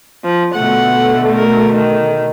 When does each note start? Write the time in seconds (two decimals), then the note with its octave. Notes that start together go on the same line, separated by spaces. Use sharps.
0.24 F3
0.54 B2 D3 A3 F#5
1.34 A#4
1.73 D#3